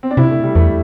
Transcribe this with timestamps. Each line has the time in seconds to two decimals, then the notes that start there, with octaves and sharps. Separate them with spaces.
0.03 C4
0.11 D4
0.17 C3 E4
0.31 A3
0.43 G3
0.55 E2 A3